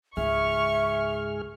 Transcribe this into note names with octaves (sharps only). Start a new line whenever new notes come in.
C#2 G#2 G#4 E5 C#6 F6